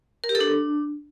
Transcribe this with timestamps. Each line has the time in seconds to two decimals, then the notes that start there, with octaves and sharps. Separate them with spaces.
0.24 A#4
0.29 G4
0.35 A4
0.41 D4